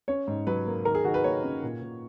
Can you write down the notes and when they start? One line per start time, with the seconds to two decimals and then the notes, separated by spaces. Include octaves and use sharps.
0.08 C#4 C#5
0.27 G#2
0.47 F#3 B4
0.66 A#3
0.85 D#3 A#4
0.95 G#4
1.05 D#3 F#4
1.14 B4
1.24 A#3 C#5
1.43 C#4
1.63 A#2
1.82 A#2